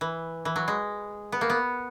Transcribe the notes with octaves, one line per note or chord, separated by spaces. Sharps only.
E3
E3
F#3
G#3
B3
A#3
B3